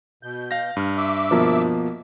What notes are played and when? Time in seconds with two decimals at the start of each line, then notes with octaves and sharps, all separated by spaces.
0.23 B2 G6
0.51 F5 A#6
0.77 G2 F6
0.97 E5 D6 E6
1.31 B2 F3 A#3